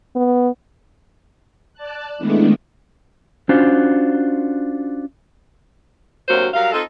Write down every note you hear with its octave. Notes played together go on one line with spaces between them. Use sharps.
B3
D5 A5 F#6
D#3 G#3 A3 B3 D4 E4
C#4 D4 F4 F#4 C5
D2 C3 F#3 A#3 F#4 C5
F#3 G3 A#4 F5
C4 D#4 F4 A4